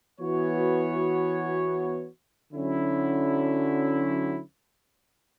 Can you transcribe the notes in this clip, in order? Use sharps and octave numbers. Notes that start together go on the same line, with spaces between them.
E3 B3 F#4 C#5
D3 F#3 C#4 E4